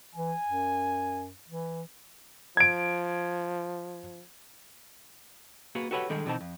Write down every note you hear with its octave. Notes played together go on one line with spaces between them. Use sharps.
E3 G#5
F#2
E3
F3 G#6 D7
A#3 B3 F#4 G#4
F#4 G4 A4 B4 C#5 F#5
D3 D#3 G3 G#3 G#4 A4
B2 D#3 E3 C4 D#4 A5
F2